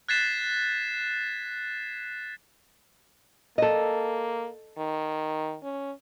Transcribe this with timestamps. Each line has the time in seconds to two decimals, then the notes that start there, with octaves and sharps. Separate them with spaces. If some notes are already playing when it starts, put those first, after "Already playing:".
0.09 F#6 G#6 A6 B6 C7 E7
3.58 A#3 A4 D#5
4.78 D#3
5.63 C#4